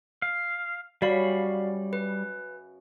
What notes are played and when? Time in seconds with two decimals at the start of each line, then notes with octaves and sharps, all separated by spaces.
0.22 F5
1.02 F#2 C#3 G3 F#4 D5 F5 B5
1.93 B4